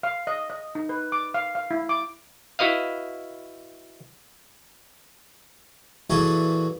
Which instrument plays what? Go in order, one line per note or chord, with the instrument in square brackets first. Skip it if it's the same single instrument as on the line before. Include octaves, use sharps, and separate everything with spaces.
[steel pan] F5
D#5
D#5
D#4
B4
D6
F5
F5
E4
D6
[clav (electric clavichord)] E4 F#4 B4 D#5 F5
[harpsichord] A#2 E3 F#4 G#4 A4